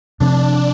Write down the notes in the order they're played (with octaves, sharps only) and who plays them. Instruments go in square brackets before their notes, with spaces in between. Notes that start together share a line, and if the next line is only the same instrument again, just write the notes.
[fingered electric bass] C3 F3 C4 [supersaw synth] D4